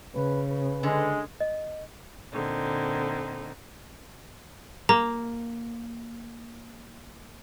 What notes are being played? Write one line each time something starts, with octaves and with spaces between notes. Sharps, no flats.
C#3 B4
B4
D3 G#3
D#5
A#2 D3 C4 D#4
A#3 A#5